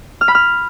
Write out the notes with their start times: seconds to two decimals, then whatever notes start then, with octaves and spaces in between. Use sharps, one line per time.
0.21 F6
0.28 B5
0.35 F6